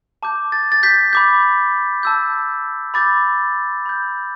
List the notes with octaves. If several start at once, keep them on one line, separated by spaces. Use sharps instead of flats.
A5 D6 G6
A6
A6
G6 B6
B5 D6 G6
A5 E6 G6
B5 D6 G6 A6
B5 G6